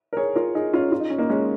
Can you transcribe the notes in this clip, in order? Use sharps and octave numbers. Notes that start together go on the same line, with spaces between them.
A#4
G#4 C#5
F4 A#4
D#4 G#4
C#4 F4
F4
D#4
C#4
A#3 D#4
G#3 C#4